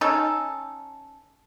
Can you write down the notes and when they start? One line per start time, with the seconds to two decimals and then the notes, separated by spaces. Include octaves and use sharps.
0.01 C#4 D#4 A4